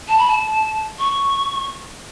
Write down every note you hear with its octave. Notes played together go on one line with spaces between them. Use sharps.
A5
B5
A5
C#6